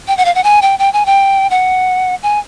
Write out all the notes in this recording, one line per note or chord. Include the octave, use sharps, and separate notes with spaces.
G5
F#5
F5
F#5
G#5
G5
G5
G#5
G5
F#5
G#5